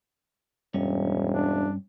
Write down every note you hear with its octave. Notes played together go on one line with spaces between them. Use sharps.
E1 G2 C#4
D4